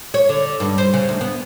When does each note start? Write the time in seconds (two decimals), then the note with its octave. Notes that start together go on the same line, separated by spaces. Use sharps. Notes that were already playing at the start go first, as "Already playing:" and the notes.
0.14 C#5
0.29 D3
0.60 G2
0.78 C5
0.94 C#3
1.09 D2
1.21 B3